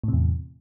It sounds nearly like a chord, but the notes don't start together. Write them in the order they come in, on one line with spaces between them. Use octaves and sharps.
A2 C3 E2